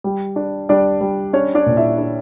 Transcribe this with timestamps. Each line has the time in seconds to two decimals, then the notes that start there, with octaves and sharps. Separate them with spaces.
0.04 G3
0.36 D4
0.69 G3 D4 D5
1.01 G3
1.33 C#4 D4 C#5
1.55 D4 D5
1.66 A#2
1.77 E4 E5
1.98 D4